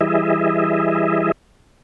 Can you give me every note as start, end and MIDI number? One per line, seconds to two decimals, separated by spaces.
0.01 1.32 52
0.01 1.32 55
0.01 1.32 64
0.01 1.32 68
0.01 1.32 75
0.01 1.32 76